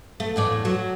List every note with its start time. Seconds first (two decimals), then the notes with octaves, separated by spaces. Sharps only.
0.20 A3
0.36 E2 A2 D5
0.65 F#3